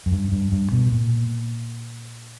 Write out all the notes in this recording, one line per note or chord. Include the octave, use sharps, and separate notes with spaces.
F#2
G2
G2
G2
B2
A#2